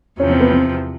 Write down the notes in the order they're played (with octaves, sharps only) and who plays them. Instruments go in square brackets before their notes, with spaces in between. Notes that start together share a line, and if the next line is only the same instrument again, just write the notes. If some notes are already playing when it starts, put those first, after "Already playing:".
[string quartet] E2 C3 F3 [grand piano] C#4
[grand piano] C4
B3
C4